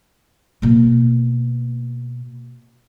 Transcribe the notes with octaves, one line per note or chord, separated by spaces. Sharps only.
B2 A#3